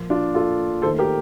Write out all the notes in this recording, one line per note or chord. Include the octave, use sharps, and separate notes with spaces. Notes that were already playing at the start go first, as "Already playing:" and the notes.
Already playing: A#2 F3 A#3
D4 F4
F4 A4
D#2 D#3 A3 A4 C5
G4 A#4